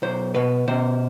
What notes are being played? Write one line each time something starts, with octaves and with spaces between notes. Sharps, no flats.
B1 C5
B2 B4
B2 C5